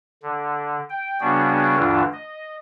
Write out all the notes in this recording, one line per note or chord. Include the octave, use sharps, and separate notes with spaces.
D3
G5
C#3 G3 B3 D4 F#4 G#4
D2 G2 D3 E3 D4 F4
D#5